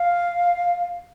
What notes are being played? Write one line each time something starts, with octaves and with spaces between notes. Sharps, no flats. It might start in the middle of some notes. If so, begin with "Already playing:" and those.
Already playing: F5